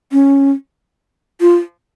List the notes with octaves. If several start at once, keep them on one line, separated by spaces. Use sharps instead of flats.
C#4
F4